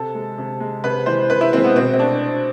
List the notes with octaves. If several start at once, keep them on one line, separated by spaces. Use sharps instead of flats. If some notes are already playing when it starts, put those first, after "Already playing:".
Already playing: C3 A4
G#3
C3
G#3
C3 B4
E3 G#3 C5
C3 B4
E4
E3 G#3 C4
B3
B2 C4
C4
A3 D4